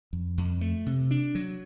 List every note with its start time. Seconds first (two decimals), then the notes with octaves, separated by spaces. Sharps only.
0.13 F2
0.38 F2
0.61 A3
0.86 C3
1.11 D4
1.35 F#3